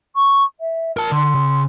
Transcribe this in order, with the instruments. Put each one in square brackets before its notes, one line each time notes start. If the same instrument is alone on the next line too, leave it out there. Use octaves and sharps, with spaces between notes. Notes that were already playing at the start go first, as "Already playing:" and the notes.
[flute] C#6
E5
[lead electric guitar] A#4 A5
[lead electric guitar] D3 [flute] C6
[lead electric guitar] C#3